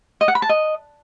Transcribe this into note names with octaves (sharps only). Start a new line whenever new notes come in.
D#5
F#5
B5
A5
D#5